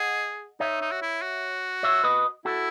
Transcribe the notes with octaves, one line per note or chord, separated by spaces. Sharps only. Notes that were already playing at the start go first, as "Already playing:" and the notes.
Already playing: G#4 D#5 F#5
D#4 C#5 E5
D#4
F#4
E4
F#4
C#5 E5
B4 D#5
E4 F#4 A4